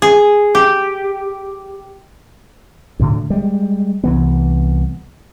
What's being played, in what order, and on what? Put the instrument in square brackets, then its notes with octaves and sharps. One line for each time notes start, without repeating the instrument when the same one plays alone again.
[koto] G#4
G4
[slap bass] D2 A2 D3
G3 G#3
C2 E3 B3